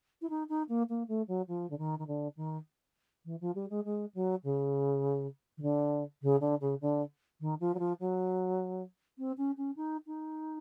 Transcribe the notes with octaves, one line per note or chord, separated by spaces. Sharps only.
E4
D#4
D#4
A#3
A#3
A3
F#3
F3
D3
D#3
D#3
D3
D#3
E3
F3
G3
G#3
G#3
F#3
C#3
D#3
D3
C#3
D3
C#3
D3
D#3
F3
F#3
F3
F#3
C4
C#4
C#4
D#4
D#4